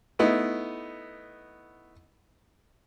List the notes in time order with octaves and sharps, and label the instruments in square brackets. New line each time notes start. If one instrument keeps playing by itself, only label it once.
[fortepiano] A3 B3 D#4 E4